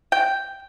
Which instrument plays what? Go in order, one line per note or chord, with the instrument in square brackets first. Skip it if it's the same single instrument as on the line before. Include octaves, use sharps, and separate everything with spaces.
[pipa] G5